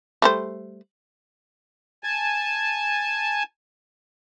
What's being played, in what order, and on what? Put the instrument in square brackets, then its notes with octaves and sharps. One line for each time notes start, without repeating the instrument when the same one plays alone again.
[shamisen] G3 A3 C5
[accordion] G#5 A5